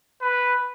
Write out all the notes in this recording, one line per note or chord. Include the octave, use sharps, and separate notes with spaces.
B4